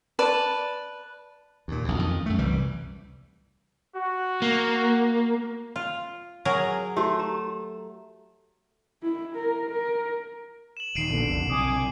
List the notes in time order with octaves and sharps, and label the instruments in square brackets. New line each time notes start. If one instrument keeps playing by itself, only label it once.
[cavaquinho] B4 D5 A5
[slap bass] D#2 A#2
A#1 D#2
F2 D#3
F#2 A3
C2 E3 G3
[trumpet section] F#4
[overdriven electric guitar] A#3
[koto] F4
F#3 G#4 A#4
[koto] A3 [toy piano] F#4 G4
[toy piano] G4 A#5
[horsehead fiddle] E4
A#4
A#4
[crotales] E7 F#7
[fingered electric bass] D#1 D#3 [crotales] C7 D7 D#7
[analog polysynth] A#1 D3 [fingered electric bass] A#2 B3
[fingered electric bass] C2 F2
[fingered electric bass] B1 C3 [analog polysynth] G#5 D6 D#6